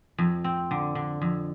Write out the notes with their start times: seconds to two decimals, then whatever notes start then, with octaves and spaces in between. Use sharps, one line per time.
0.18 F2
0.44 C4
0.71 D3
0.95 D3
1.22 F2